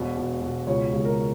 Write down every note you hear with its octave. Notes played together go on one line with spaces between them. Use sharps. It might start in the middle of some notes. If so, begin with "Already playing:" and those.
Already playing: E1 B2
B2
B2
C#2 C#5
C#2
A#4